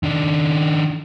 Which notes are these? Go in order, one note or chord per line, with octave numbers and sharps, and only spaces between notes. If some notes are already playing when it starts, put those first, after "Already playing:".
D#3 D4